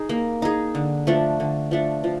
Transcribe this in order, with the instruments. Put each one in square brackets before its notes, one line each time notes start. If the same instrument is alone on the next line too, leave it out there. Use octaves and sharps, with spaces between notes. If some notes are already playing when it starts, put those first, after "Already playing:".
Already playing: [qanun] D#4 G#4
A#3
D#4 G#4
D3
F3 A3 D4
D3
F3 A3 D4
F3